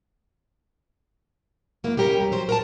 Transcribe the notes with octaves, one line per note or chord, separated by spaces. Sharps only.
F#3 A#3 E4
G3 C#4 G4 A#4
F2
F#3 C5
A#4 F#5 A5